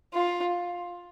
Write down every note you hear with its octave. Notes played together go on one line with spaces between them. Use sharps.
F4